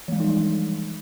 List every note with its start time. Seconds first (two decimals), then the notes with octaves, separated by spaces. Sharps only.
0.08 E3
0.12 G#3
0.16 F3
0.20 D#4
0.24 G3